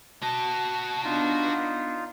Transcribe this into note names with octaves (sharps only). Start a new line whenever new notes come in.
F#4 D#5 A5
B3 D4 D#4 F4